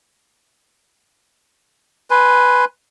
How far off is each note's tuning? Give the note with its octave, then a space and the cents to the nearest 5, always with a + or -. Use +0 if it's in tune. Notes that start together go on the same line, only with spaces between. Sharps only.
B4 +0 G#5 +0 C6 +0